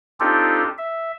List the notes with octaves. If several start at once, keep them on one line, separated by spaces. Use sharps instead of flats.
C4 D4 D#4 F4 G4 A4
E5